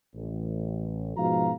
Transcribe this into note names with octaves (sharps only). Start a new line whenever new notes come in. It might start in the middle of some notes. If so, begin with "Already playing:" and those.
A1
G#2 B2 F3 F#4 F5 A#5